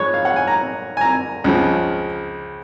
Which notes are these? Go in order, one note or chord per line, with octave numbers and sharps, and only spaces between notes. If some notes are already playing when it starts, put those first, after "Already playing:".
Already playing: G#2 F3 B4 C#5
F5
F#5
G#5
A#5
G#5
A#5
C#2 C#3 F3